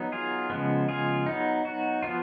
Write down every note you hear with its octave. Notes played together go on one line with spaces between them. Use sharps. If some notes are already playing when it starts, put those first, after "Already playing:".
Already playing: F#3 B3 D#4
F4 G#4
C#3 F3 G#3 B3
F4 G#4
F#3 B3 D#4
F#4
F3 B3 F4